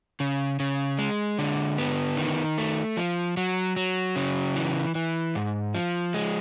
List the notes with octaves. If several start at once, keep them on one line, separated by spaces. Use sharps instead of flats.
C#3
C#3
G#3
D3
B3
D#3
A3
F3
F#3
F#3
C#3
E3
E3
G#2
F3
G#3